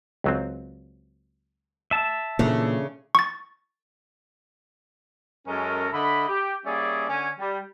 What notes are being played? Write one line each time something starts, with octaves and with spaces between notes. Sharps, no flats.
C#2 F#3 C4
E5 A5
A#2 C#3 E3 A3 A#3 D4
C#6 A6
F#2 G#3 C#4 A4 A#4
D3 D#5 E5 B5
G4
G3 A#3 C#4 G#4 D5 E5
D3 C#4 G#5
G3